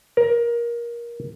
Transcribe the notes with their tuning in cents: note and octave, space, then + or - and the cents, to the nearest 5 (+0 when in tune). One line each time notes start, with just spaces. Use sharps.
A#4 +20